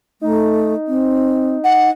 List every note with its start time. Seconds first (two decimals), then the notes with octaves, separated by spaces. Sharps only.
0.21 A3 D#4
0.87 C4
1.64 F#5